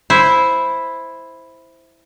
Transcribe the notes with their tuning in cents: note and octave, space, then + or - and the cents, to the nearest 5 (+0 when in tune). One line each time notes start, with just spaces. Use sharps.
E4 +0 C5 +0